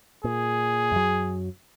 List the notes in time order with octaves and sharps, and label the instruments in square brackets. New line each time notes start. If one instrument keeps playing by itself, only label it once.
[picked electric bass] A#2 [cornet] G#4
[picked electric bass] F#2 F#3